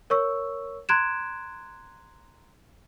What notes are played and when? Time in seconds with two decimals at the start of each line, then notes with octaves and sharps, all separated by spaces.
0.10 A#4 C#5 C#6 E6
0.89 A#5 C6 F#6 G#6 D7 E7